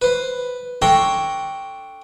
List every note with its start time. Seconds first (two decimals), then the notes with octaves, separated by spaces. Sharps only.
0.02 B4 C5
0.82 D4 A4 C#5 G5 A#5 C6